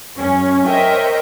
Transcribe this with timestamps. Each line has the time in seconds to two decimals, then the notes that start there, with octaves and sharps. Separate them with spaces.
0.17 F#2 C#4
0.65 A#4 C5 C#5 D#5 E5 G5